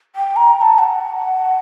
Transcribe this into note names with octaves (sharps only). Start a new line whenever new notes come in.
G5
A#5
A#5
A5
F#5